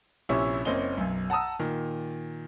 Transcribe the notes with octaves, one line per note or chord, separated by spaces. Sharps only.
A#1 C3 C#4 E4 E5 C#6
F#1 A#3 C4 C#4 D#5 G7
B1 F#2
F#5 A5 A#5 D#6 E6
A#2 D#3